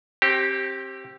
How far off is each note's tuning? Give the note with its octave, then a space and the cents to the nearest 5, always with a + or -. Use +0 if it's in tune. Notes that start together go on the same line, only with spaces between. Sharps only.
C4 +30 G4 -10